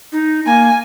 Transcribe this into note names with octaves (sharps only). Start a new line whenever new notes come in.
D#4
A#3 G#5